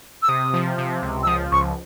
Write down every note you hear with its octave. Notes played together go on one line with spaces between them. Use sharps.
E6
C3 D#6
F3
C3
C#2
E6
F3 D#6
C#2 C#6